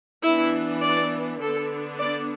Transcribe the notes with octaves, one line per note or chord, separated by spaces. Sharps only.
E3 B3 D4 E4
D5
D3 B3 D4 A4
D5